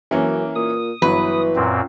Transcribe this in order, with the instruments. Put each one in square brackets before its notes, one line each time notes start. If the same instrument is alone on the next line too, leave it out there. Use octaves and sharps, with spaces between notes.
[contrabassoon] F#2 [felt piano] E3 A#3 C#4
[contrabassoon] A#2 [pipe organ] D#6
[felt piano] G1 F#3 [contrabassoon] E3 [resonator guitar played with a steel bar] B4
[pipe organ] F#2 A#2 C4